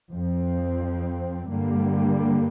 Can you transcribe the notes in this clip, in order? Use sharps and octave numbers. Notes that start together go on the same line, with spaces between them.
F2 F3 C4
G2 D3 G3 A#3